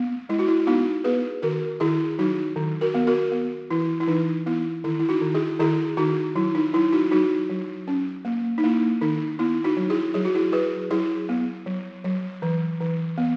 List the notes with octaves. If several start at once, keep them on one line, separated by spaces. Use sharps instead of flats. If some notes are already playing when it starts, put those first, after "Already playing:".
Already playing: B3
G#3 E4
F#4
E4
B3 D#4 F#4
B3 G#4 B4
D#3 F#4 A#4
D#3 E4 G#4
F#3 D#4 F#4
D#3
F#4 A#4
B3
F#4 A#4
B3
E3 E4
E4
E3 D#4
B3 E4
D#3 E4
E4
D#4 F#4
D#3
E4 G#4
D#3 E4 G#4
D#3 D#4 F#4
F#3 E4
D#4
F#3 E4
D#4 F#4
F#3 D#4 F#4
F#3
C#4
A#3
D#4
A#3 E4
D#3 D#4
B3 E4
D#4 F#4
F#3
E4 G#4
F#3 G#4
F#4
E4 G#4
F#3 G#4 B4
F#3 E4 G#4
B3
F#3
F#3
E3
E3
B3